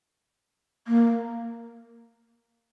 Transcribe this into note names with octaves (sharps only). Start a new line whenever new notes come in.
A#3